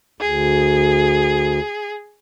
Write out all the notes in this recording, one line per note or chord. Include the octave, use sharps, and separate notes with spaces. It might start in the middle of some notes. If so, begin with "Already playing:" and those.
D2 G#4